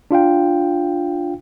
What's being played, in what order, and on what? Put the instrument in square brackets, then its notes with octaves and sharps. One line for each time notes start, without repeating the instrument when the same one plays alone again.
[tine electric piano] D4 F4 F5 G5